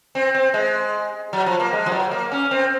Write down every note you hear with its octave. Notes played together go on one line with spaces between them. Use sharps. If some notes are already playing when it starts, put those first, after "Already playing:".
C4
C4
G#3
F#3
F3
A#3
G#3
F3
F#3
A#3
C#4
C4